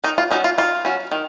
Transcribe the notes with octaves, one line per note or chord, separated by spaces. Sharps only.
D#3 D#4
F4
F#3 C#4 D#4
F4
D#3 F4
F#3 C#4
D#3